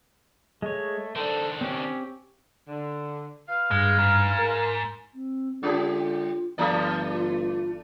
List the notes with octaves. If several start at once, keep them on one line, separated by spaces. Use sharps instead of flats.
G#3 A3 C#5
D#3 D4 A4 C5
C4 C#4 G4
D3
B4 F5
G2 G#3
G#2
A#4
C4
D3 G3 C#4 F4 G4
G1 E3 A3 A4 D5
F4